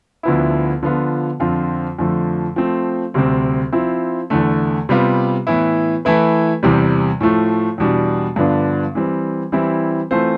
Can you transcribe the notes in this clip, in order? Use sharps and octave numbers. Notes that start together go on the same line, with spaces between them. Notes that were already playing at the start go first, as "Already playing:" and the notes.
D2 D3 F3 B3 E4
D3 F3 B3 F4
F2 D3 F3 C4 F4
F2 D3 F3 A3
F3 A3 C4
D2 C3 G3 C4
F3 C4 E4
E2 D3 A3
C3 G3 B3 F4
A2 E3 B3 E4
E3 A3 E4 B4
E2 C3 G3
A2 F3 A3
E2 B2 G3 D4
G2 D3 F3 B3 D4
E3 G3 C4
E3 G3 C4 E4
E3 A3 C4 F4 C5